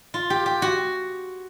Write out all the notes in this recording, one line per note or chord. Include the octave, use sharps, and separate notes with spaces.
F4
G4
G4
F#4